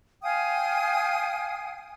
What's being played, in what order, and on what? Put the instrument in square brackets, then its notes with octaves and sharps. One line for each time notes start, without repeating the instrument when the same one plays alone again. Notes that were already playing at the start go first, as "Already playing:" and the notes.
[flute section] F5 G5 G#5 D#6